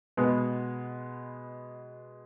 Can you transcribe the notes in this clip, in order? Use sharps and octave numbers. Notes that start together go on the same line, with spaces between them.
B2 G#3 B3